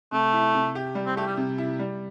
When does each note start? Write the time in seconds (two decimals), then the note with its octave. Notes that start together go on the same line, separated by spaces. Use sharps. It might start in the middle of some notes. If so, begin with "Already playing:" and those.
0.12 C3 A3
0.33 E4
0.55 C3
0.75 G4
0.95 G3
1.06 C4
1.16 A3 G4
1.27 G3
1.37 C3
1.58 E4
1.79 G3